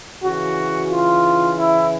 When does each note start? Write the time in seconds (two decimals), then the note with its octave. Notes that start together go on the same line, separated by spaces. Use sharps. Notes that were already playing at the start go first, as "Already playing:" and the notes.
0.23 C#3 E3 F#4
0.91 F4
1.58 E4